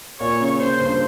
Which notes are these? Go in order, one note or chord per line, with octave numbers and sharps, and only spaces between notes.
A#2 C#5
C#3
C#3 C5
G2